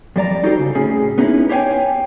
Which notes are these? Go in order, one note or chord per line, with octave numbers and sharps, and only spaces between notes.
F2 G3 D5 A#5
D#4 F#4 G4 A4 C5
C#3
A2 C#4 G#4
B3 C#4 D#4 E4 B4
G4 C5 C#5 F5 G5 G#5